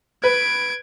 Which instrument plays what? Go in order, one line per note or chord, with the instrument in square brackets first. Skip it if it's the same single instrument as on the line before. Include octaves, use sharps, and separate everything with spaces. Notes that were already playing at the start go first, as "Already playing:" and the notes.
[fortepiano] B4 [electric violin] G#6 D7